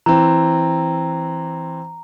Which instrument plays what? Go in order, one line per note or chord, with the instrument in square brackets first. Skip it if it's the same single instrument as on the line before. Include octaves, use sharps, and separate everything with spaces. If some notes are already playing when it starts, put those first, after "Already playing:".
[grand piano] E3 C4 [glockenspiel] A#5